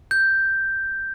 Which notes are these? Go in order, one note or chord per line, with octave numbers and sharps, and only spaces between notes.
G6